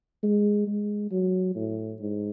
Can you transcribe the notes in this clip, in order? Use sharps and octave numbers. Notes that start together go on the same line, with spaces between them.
G#3
G#3
F#3
A2
G#2